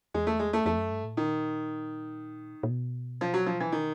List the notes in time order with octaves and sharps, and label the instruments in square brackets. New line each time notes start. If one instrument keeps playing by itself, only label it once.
[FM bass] E2 [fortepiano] G#3
[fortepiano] A3
G#3
A3
[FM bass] F2 [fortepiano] A3
[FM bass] F#2
G2
A2
[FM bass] A#2 [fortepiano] D#3
[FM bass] A#2
B2
[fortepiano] F3
F#3
F3
E3
D#3